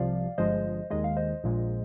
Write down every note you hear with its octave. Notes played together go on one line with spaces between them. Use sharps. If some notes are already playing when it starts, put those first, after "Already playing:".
Already playing: C2 C3 F3 D5 F5
G1 G2 F3 G#3 C5 D#5
D#2 D#3 G#3 D#5
F5
C5 D#5
A#1 A#2 G#3